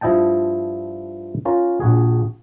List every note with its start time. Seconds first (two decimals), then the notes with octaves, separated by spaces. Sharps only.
0.01 G2 F3 E4 D#5 G5 A5
1.45 C#4 F4 A#4
1.80 A#1 F#4 G#4